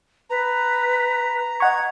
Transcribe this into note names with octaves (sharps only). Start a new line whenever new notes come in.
B4 A#5
D#5 F#5 C#6 G#6